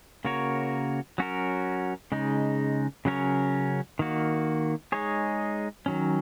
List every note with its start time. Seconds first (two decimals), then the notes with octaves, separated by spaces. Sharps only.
0.25 C#3 A#3 F#4 A#4 C#5
1.18 F#3 C#4 F#4 A#4
2.12 C#3 G#3 D#4
3.05 C#3 F#3 C#4 A#4 C#5
3.99 D#3 A#3 F#4
4.92 G#3 D#4 G#4 C#5
5.86 D#3 F#3 C#4